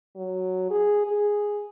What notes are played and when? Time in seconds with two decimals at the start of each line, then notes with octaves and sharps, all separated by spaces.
0.16 F#3
0.71 G#4
1.07 G#4